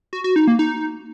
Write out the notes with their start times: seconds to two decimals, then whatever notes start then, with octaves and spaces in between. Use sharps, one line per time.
0.13 F#4
0.24 F#4
0.36 D#4
0.47 A#3
0.59 D#4